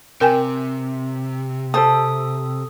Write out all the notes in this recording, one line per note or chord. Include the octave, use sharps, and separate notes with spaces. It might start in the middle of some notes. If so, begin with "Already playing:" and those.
C3 A#4 G5 G#5
A4 C5 A5 D#6